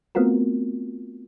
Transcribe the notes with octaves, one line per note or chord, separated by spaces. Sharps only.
A3 B3 C4 F4 F#4 A#4